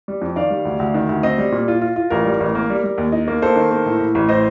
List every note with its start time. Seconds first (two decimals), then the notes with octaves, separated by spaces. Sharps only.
0.08 G3
0.21 F2
0.36 D#3 D5 F5
0.50 G3
0.65 D2
0.80 D2
0.94 D#3
1.09 D2
1.23 C4 C5 D#5
1.38 G3
1.52 A#2
1.68 F4
1.81 F4
1.96 F4
2.10 A1 A#4
2.25 G3
2.40 A1
2.55 A#3
2.70 G3
2.84 G3
2.98 D#2
3.12 D#4
3.28 A#3
3.42 A#3 A4 C5
3.56 D#3
3.71 A#3
3.86 A2
4.00 A2
4.15 A1
4.29 A2 C5 D#5